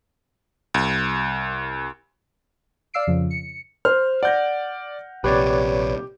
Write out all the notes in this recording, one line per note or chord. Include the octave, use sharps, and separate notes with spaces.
C2
D5 F5 E6 C7 D7
F2 C#3 F3
C#7
C5 F6
D5 F#5 G6 A#6
A#1 C3 G4 B4 C#5 D5